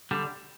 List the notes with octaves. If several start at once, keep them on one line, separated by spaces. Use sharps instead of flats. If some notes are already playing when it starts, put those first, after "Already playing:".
D3 G3